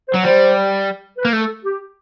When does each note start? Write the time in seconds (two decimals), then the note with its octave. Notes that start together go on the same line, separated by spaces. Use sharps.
0.09 C5
0.15 F#3
0.24 G3 C5
1.18 B4
1.25 A#3
1.33 A3
1.41 A4
1.64 G4